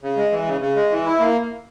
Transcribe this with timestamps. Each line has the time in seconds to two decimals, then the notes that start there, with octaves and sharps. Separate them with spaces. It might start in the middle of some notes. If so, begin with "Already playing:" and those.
0.03 C#3
0.17 G#3
0.32 E3
0.47 C#3
0.61 C#3
0.76 G#3
0.91 E3
1.05 E4
1.20 A#3